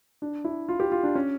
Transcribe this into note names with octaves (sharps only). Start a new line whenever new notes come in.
D4
E4
F4
G4
F4
D4
C#4